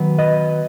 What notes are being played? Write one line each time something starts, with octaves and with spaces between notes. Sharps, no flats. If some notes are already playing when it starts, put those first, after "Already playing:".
Already playing: D#3 F#3 B3
B4 D#5